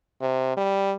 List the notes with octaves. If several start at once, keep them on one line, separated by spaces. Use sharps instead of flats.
C3
G3